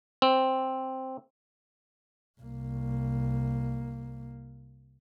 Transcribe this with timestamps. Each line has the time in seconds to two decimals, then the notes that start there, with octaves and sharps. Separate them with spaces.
0.22 C4
2.40 C2 A#3